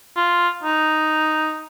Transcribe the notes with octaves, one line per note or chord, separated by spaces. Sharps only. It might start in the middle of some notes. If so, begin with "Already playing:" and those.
F4
D#4